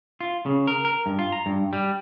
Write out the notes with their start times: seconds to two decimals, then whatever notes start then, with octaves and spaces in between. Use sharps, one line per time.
0.21 F4
0.46 C#3
0.67 A#4
0.85 A#4
1.06 G2
1.19 F4
1.32 A#5
1.46 G2
1.73 G3